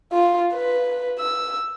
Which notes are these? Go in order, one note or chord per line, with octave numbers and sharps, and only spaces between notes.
F4
B4
E6